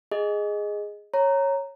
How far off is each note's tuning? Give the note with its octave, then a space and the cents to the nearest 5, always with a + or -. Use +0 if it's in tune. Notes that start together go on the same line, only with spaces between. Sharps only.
G#4 +0 D#5 +0
C#5 -10 A#5 -5